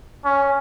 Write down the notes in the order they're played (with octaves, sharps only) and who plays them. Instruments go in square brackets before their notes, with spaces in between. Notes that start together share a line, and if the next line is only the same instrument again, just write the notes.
[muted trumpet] C#4